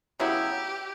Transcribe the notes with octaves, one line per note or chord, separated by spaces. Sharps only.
C#3 F#3 B3 E4 G4